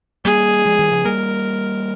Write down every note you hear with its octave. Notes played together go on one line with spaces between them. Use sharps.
G3 A#3 G#4
F3 G#3
D#3 G3
C#3 F3
G3 A#3 A#4